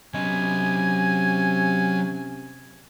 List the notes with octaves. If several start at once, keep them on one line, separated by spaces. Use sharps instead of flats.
C3 F#3 C#4 D#5 G#5